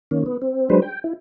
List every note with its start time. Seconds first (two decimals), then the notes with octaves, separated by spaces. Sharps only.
0.11 D#3 A#3 C#4
0.26 B3
0.42 C4
0.70 F#3 G#3 D4 B4 C5
0.82 G5
1.04 E4